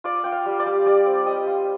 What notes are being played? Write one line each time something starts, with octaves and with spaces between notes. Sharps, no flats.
F4 D5
F4 G5
F5
G3
D5
G3
G3 D5
C4
G3 D#5
F4